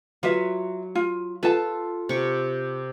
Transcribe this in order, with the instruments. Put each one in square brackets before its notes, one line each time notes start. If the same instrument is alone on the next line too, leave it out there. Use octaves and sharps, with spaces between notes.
[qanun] F#3 [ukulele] F4 B4 E5
[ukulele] F4
[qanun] F4 A4 [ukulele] B4 A5
[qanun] C3 C#6